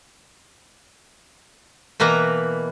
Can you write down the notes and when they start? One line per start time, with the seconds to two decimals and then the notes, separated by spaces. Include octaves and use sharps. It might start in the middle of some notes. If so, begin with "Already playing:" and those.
2.00 B2 E3 A#3 B4 A#5